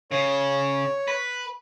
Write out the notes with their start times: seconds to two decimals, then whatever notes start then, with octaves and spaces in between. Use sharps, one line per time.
0.11 C#3 C#5
1.08 B4